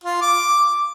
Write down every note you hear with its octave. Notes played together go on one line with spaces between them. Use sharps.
F4
D6